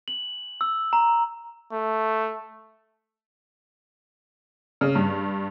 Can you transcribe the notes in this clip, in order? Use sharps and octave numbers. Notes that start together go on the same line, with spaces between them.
F#7
E6
A#5
A3
C#3
G2